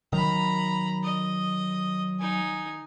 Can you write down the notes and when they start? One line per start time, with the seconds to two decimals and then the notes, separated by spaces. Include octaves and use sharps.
0.13 D#3 F#3 A#5 B5
1.03 D#5
2.19 D#4 G#5